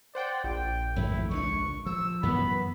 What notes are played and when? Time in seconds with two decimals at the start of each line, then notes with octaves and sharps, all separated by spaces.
0.15 C5 D5 F#5 G5
0.44 A#1 G5
0.96 G#1 F2 A3 E4
1.31 C#2 F#3 D4 C#6
1.86 F3 E6
2.23 F#2 E3 B3 B5